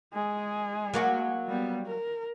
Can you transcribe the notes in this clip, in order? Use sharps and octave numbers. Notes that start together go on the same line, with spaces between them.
G#3 G#4
F#3 A#3 F#4
G3 B3
A#4